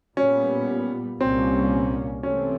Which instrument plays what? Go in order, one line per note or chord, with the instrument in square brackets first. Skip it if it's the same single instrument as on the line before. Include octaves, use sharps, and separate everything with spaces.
[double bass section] A#2 G3 B3 [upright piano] C#4
[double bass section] C2 A#2 G3 A#3 C#4 [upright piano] C4
[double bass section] C3 E3 A3 C4 [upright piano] C#4